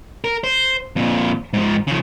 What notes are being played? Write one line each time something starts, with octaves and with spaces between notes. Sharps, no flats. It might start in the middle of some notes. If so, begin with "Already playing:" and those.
A#4
C5
F2 A#2
G#2 F3
C#3 F3